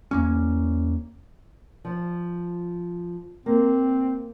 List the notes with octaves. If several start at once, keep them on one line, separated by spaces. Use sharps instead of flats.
E2 A#3 C#4
F3
A#3 C4